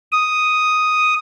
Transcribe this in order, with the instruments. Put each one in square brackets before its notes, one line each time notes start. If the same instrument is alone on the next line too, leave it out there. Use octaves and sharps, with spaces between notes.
[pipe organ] D#6